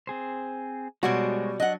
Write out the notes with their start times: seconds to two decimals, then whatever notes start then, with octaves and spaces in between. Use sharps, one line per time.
0.07 C4 G#4 C5
1.03 B2 G3 G#3 F#4 C5 C#5
1.60 F#3 D4 D#5 F#5